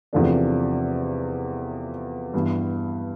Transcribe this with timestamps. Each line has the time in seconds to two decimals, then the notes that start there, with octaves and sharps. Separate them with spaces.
0.13 E2 C3 F3 A3 D4
2.34 G2 E3 B3